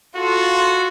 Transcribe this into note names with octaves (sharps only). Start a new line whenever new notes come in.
F4 F#4 A4